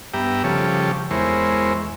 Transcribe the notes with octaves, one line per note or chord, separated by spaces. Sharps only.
G2 B3 G4 E5 G5 A#5
C#3 F3 G3 G4 A4 C#5
E2 G#3 E4 A#4 C5 C#5